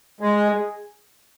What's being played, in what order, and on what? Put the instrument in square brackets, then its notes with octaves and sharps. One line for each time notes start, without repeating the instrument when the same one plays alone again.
[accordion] G#3 [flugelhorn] G#4